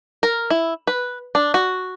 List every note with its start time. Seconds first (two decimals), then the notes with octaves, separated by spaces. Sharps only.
0.23 A#4
0.50 E4
0.87 B4
1.35 D4
1.54 F#4